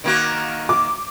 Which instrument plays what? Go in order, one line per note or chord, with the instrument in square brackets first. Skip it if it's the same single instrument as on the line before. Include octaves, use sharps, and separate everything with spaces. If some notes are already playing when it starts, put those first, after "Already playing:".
[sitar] D#3 A#3 F#4
[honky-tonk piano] D6